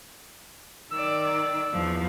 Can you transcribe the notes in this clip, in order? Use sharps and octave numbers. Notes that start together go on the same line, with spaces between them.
D#3 D5 E6
E2 F3